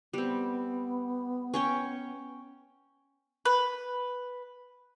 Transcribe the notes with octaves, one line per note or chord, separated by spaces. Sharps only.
G3 B3 C4
C#4 C#5 G5
B4